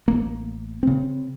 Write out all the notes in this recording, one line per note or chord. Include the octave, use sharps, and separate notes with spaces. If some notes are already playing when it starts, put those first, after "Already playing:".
A1 A#3
C#3 C4